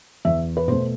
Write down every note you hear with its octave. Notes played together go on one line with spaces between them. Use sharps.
E2 E5
B4
B2 A3 C5